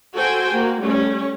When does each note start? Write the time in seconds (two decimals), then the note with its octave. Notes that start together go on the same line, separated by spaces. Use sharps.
0.14 F#4 A4 C5 G5 G#5
0.53 A#3 F#4
0.82 G3 A3 C#4